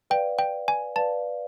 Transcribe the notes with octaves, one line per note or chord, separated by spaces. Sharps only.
B4 D5 F5 G5
G5
G#5
B4 D5 F5 A5